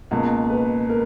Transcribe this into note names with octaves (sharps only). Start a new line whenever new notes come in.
C#2 B2 A#3
B4
A#4